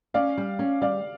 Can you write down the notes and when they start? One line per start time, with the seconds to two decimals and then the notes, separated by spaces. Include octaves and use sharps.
0.14 C#4 D5 F5
0.38 G3
0.59 C#4
0.82 G3 D5 F5